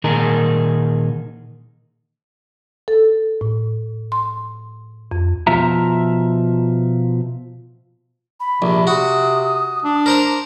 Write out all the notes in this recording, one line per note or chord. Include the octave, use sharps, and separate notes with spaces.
A#2 D#3 D#4 G#4 A#4
A4
A2
C6
F2
B2 F3 F4 E5 A#5
B5
A#1 C3
F#4 D#6
D4
A#4 C5 A#5